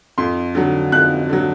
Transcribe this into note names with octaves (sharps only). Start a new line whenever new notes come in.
F2 C6
D3 F#3
F2 F#6
D3 F#3